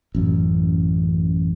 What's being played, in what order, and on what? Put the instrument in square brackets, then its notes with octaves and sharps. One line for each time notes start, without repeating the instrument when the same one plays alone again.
[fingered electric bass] A1 F#2